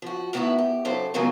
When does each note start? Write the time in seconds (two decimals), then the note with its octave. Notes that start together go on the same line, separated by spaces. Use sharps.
0.02 F3 F#4
0.33 A2 D#3 B3 D4 E4 F#4
0.58 G4
0.85 F#2 C#3 A4 C5
1.14 F2 G#2 C#3 F#3 B3 G#5